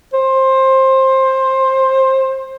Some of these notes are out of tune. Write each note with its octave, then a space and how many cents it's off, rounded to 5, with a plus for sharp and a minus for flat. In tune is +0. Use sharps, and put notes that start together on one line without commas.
C5 +20